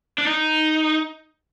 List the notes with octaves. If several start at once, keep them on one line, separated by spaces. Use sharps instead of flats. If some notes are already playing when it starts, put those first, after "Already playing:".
D4
D#4